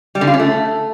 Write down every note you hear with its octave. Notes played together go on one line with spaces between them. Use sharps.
G3
D3
F4
C#4
A3